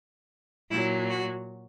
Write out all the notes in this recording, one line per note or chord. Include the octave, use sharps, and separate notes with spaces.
A#2 F#3 E4
F#4